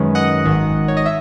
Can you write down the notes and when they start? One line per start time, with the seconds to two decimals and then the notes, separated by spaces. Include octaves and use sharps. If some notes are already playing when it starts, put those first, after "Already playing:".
Already playing: F#2 D#3 G#3 C#4 B4
0.15 D#5 F#5
0.45 G#1 G#2 D#3
0.88 C#5
0.97 D#5
1.06 E5